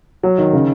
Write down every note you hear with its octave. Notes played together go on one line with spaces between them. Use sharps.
F#3
D#3
C#3